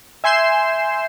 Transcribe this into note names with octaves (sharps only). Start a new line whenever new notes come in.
E5 G#5 C6 G6 C7 E7